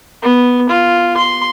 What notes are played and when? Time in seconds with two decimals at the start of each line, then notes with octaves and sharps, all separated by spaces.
0.22 B3
0.70 F4
1.17 C6